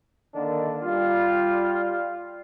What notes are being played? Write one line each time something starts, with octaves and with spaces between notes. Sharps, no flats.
D3 D#3 A#3 D4
G3 F4